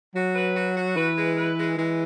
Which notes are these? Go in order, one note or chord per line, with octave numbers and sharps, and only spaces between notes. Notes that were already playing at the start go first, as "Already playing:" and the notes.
F#3 F#4
B4
F#4
F#4
E3 B4
G#3
B4
G#3
E3 G#3